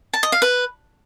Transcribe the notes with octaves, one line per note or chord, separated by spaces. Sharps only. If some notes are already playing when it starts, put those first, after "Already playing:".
A5
D#5
F5
B4